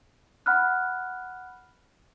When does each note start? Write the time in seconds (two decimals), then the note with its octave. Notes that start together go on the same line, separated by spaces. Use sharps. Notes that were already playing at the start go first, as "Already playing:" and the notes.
0.46 F#5 B5 F6 F#6